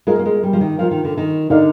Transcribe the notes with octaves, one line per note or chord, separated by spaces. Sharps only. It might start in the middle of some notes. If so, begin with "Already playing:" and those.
G#3 F4 A#4 F5
A#3
G#3
G3
F3
D#3
F3 F4 A#4 F5
D#3
D3
D#3
D3 D#4 A#4 D5 F5